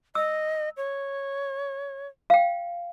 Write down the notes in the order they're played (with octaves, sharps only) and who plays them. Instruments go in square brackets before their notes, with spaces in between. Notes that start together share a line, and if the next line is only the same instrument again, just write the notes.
[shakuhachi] D#5 [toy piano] E6
[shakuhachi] C#5
[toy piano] F5 G5